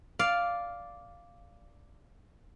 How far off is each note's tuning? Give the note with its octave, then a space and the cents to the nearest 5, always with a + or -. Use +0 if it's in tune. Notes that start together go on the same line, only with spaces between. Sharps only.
D5 -5 F5 +0